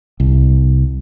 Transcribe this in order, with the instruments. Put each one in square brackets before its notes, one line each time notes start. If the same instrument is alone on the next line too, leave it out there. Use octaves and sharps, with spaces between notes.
[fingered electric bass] C2